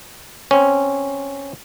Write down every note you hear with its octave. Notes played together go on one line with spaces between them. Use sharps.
C4 C#4